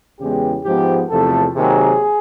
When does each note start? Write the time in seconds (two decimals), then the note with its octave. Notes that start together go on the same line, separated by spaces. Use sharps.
0.19 E2 C#3 E3 G#3 B3 G4
0.64 G#2 F3 G#3 B3 G4
1.10 E2 C3 F3 A3 A4
1.55 C3 D#3 F#3 A#3 G#4